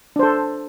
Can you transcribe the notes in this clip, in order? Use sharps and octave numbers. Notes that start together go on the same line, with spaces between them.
D4 A4 C5